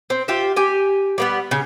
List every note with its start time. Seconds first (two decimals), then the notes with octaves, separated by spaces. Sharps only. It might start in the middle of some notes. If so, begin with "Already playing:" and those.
0.10 C4
0.28 F4 G4 E5
0.56 G4 G#5
1.18 G3 A#3 B3
1.51 C#3